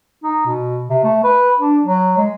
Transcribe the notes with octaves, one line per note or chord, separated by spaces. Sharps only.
D#4
B2
C3
A3
B4
D4
F#3
G#3